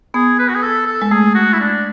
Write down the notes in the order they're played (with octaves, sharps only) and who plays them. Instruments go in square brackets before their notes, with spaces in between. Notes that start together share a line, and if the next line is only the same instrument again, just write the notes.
[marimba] B3 [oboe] G#4
[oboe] B4
F#4
G#4
A4
A4
[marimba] G#3
[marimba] A3 [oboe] G#4
[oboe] F#4
E4
D4